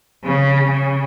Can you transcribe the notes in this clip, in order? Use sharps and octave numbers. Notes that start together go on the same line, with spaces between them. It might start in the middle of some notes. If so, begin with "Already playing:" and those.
C#3
C#3